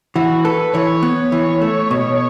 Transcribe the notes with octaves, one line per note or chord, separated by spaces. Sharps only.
E3 F#4
A4 B4
E3 C#5
B3
E3
A3
B2